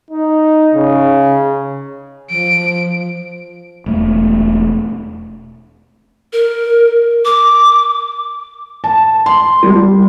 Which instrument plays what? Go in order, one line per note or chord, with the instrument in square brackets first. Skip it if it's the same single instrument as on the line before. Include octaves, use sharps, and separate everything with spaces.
[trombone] D#4
C#3
[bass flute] F3 [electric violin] D7
[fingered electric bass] E1 A3
[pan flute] A#4
D6
[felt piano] A5
C6
G3